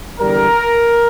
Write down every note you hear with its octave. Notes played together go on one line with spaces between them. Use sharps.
E2 D3 G3 A#4